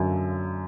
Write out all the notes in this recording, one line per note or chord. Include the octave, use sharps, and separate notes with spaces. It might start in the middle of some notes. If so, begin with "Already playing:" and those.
Already playing: F#2 D3